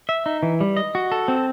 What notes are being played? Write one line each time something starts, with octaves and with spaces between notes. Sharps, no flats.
E5
D#4
E3
G3
D#5
F#4
A4
C4